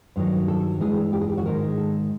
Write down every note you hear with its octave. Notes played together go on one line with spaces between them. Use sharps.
G2 D#3 F#3
A4
G2 E3 G#3 G#4
G4
G#4
G4
F#4
G#2 D#3 G#3 A#4
A4